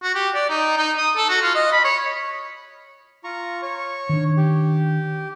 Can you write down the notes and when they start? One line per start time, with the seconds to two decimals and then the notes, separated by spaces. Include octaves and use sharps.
0.03 F#4
0.15 G4
0.34 D5
0.49 D#4
0.78 D#4
0.98 D#6
1.17 A4
1.29 F#4
1.42 F4
1.55 D#5
1.72 B5
1.84 C#5
3.24 F4 A#5 C#6
3.62 C#5 C#6
4.09 D#3 D4
4.37 G4